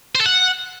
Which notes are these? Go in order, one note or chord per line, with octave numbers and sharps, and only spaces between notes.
C5
A4
F#5